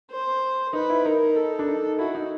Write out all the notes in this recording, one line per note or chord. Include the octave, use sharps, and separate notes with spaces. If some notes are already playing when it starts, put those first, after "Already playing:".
C5
D#4 B4
E4
D#4 A#4
A4
D4
D#4
E4 F#4
D#4